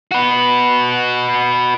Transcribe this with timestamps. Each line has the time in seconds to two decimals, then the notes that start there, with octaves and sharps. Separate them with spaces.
0.11 F#4 B4